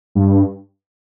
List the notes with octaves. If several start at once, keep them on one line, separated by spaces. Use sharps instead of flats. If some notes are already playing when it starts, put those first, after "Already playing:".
G2